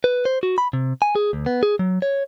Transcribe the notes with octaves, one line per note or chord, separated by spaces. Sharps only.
B4
C5
F#4
B5
C3
G#5
G#4
D2
B3
G#4
F#3
C#5